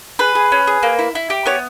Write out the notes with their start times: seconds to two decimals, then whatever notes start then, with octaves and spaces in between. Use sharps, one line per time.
0.19 G#4 B4
0.35 G#4
0.52 C#4
0.67 G#4
0.83 A#3
0.99 E4
1.15 E4
1.30 G4
1.46 B3 C#5